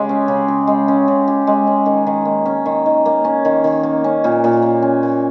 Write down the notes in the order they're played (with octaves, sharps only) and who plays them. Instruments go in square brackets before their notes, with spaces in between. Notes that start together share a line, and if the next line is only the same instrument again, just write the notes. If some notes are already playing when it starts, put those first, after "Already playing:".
Already playing: [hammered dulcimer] C#3 G#3 G4
C#4
C#3
G4
G#3
C#4
C#3
G4
G#3
C#4
D#3
D#3
A#3
C#4
D#3
D#3
A#3
C#4
D#3
D#3
A#3
C#4
A#2
A#2
A#3
C#4
A#2